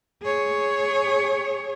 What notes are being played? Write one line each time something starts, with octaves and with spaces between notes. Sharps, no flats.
G#4 C#5